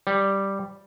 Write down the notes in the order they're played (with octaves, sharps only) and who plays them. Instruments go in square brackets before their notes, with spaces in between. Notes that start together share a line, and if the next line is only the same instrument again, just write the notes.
[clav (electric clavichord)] G3